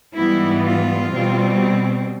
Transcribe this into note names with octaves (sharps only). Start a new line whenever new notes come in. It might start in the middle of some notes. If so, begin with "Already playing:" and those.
G#2 E3 G3 B3 E4
F4
B2 G3 C4